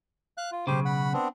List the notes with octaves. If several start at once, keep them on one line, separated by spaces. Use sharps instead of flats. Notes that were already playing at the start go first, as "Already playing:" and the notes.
F5 F#6
F4
B1 G2 C#3 G4 C5
F#5 B5
B3 C4 D4